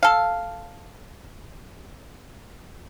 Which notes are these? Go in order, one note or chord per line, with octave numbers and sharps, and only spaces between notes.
A4 F5